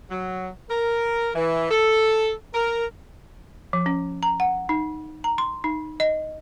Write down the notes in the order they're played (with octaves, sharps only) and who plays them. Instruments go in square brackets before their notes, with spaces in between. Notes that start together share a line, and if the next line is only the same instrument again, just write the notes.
[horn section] F#3
A#4
E3
A4
A#4
[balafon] F3
C#4
A#5
F#5
D#4
A#5
C6
D#4
D#5